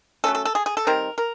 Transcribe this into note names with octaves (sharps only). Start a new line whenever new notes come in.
F#3 A3 C#4 A4
A4
A4
G#4
G#4
A4
D#3 G3 C4 A#4
A#4